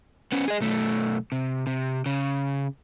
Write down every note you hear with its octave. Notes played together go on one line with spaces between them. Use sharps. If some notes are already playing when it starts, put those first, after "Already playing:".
B3 C#4
G#4 D#5
B1 A3
C3
C3
C#3